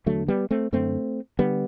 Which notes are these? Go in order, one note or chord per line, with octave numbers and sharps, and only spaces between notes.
E2 D3 F#3 A3
G3 B3
A3 C4
F#2 D3 A3 C4
D3 G3 B3